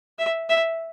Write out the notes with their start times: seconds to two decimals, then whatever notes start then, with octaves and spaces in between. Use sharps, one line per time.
0.19 E5
0.49 E5